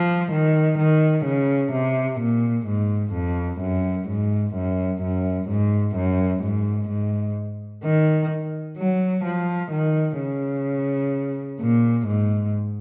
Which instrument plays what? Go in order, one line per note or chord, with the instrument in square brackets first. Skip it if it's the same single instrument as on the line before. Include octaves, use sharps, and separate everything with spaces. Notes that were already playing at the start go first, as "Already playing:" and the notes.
Already playing: [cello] F3
D#3
D#3
C#3
C3
A#2
G#2
F2
F#2
G#2
F#2
F#2
G#2
F#2
G#2
G#2
D#3
F#3
F3
D#3
C#3
A#2
G#2